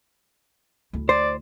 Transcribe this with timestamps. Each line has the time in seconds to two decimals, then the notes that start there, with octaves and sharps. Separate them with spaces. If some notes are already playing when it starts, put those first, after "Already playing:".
0.93 D2 E4
1.09 C5 D5